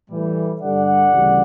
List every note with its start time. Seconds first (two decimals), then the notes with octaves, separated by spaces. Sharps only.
0.09 A2 E3 G3
0.61 G2 D3 G3 D5 F#5
1.12 D2 C#3 E3 G3